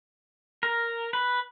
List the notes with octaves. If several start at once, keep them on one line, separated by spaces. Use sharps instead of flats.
A#4
B4